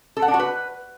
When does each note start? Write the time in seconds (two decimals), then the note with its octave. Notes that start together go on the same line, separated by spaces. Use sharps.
0.17 A4
0.22 F#5
0.28 D4
0.34 F#4
0.40 B4